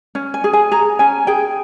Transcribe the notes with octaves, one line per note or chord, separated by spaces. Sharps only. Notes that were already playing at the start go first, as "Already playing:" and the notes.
C#4
G#5
G#4
G#5
G#4 A#5
C#4 G#5
G#4 G5